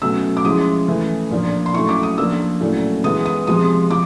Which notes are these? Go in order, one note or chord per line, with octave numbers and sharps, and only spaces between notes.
B2 F#3 A3 C#4 E6
D6
F3 G#3 C#4 E4 D#6
E3 A3 C#4 E4
A#2 F3 A#3 D4
C6
F#3 A3 C#4 E4 C#6
D6
D#6
F3 A#3 D4 E6
A#2 F#3 A3 C#4 E4
E3 G#3 B3 D#6
D#6
C3 F3 G#3 D#6
F3 D6